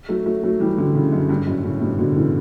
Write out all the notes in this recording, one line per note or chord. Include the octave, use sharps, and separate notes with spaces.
F#3 A3
F#3 A3
F#3 A3
E3 G3
D3 F#3
C#3 E3
F#2
G2
F#2 A2
A2 C#3
G2 B2
B2 D3
C#3 E3